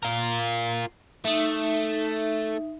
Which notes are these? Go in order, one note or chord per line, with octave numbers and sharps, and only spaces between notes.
F4 A#4
A3 D#4 E5